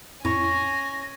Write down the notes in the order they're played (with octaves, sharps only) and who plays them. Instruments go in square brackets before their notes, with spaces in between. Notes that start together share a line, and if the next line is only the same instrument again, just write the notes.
[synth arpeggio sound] F2 A2 E4 [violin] C#4 G#5 [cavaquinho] C#5 [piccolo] A#6